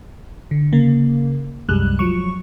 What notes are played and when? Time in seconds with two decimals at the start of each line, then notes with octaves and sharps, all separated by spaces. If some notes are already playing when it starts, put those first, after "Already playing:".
0.51 D3
0.73 C#3 A#3
1.69 C2 F#2 G3 G#3 F#6
1.99 F3 F#3 C#6